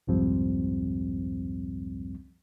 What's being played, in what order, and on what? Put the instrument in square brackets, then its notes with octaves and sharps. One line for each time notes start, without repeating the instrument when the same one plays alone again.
[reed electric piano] C2 F2 G#2 F3 G3 C4